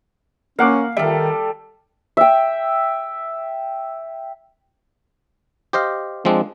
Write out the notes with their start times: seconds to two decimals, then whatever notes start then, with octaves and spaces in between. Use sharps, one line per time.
0.59 A#3 C#4 F5 F#5 D6
0.97 D#3 G3 A4 E5
2.17 E5 G5
5.73 G4 C5 D#5 F5
6.25 F3 G#3 C4 D4